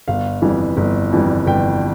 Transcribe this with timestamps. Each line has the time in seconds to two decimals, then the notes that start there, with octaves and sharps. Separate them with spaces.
0.08 G1 F5
0.42 F2 E3 G3
0.77 G1
1.12 F2 E3 G3
1.47 G1 G5